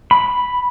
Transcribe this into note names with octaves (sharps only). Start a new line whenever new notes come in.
B5